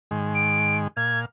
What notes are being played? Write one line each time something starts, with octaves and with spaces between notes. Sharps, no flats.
G#2 D#3 G#3
D7
A#2 F5 G#6